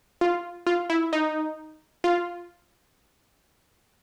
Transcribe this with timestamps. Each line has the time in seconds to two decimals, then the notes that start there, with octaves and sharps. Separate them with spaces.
0.21 F4
0.67 F4
0.90 E4
1.13 D#4
2.04 F4